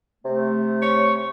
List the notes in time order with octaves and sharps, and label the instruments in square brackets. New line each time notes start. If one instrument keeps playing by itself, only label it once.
[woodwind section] C3 A3
[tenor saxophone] C#5